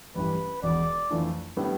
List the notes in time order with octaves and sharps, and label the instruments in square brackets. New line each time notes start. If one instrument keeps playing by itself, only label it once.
[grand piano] A1 G2 E3 G3 [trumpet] B4
[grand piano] E1 E2 B2 [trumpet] D5
[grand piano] F2 E3 A3 D4 F4
A2 G3 B3 D4